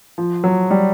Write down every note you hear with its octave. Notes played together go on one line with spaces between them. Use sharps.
F3
F#3
G3